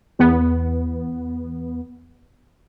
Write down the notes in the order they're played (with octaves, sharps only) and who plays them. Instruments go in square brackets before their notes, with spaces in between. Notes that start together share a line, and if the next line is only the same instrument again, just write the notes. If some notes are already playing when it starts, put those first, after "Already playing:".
[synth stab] E2 B3